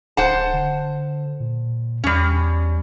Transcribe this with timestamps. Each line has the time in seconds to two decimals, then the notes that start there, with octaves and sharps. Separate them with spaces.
0.17 D1 C5 F#5 A5
0.53 D3
1.40 A#2
2.04 E2 G3 C#4